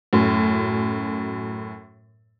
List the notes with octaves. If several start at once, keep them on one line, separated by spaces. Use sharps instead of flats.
F#2 A2